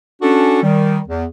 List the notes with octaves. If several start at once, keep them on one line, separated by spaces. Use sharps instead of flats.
C#4 D4 F#4 A4
D#3 G3
E2